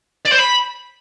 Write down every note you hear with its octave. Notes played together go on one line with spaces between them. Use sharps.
D5
C5
B5